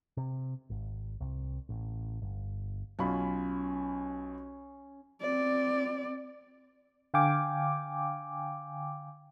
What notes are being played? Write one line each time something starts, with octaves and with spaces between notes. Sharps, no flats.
C3
G#1
C2
A1
G1
B1 C#4 F4 B5
C4 D5
D3 F5 G5 G#5 D6